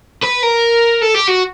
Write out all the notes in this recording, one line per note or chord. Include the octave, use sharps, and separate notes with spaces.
B4
A#4
A4
G4
F#4